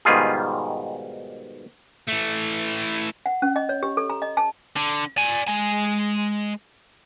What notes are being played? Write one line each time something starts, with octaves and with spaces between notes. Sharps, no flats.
G#2 B2 D#3 G3 F4 G#4
E3 A3
F#5
C#4
D#5
C#5
G4
A4
A#5
D#5
A5
D3
D5 G#5
G#3 G#5